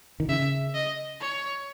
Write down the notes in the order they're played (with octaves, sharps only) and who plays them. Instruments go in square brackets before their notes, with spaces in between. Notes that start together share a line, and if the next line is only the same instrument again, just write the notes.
[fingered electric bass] D#3
[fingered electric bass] C#3 [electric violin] E5
[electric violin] D#5
C#5